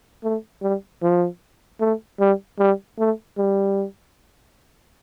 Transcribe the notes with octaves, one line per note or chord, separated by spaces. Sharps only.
A3
G3
F3
A3
G3
G3
A3
G3